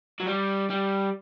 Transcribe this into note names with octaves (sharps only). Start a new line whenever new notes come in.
F#3
G3
G3